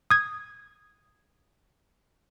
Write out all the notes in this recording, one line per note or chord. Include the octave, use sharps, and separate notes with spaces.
D#6 G#6